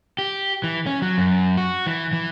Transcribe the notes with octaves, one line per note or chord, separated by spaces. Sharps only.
G4
E3
C#4
F#3
F#2
F#4
E3
E3